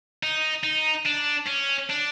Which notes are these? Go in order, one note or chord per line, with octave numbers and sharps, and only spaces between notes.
D#4
D#4
D4
C#4
D4